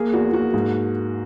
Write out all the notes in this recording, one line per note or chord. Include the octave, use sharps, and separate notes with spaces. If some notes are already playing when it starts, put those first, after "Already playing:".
Already playing: A#3 G#4
E2 F#4
A#3 F#4
G#2